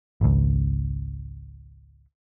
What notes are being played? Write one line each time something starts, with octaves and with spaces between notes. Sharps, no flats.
G#1 C#2